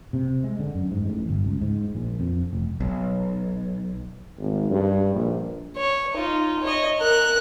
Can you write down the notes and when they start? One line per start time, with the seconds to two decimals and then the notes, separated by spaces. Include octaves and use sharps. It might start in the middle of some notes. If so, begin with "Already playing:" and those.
0.13 C3
0.44 G#3
0.59 D3
0.75 F#2
0.91 G#2
1.06 A1
1.29 G1
1.45 C#2
1.62 G#2
1.95 A#1
2.20 F2
2.53 F1
2.80 B1
4.39 G#1
4.71 G2
5.15 A#1
5.76 C#5
6.14 D#4 F4
6.63 C#5 D#5
7.00 A#4 F#6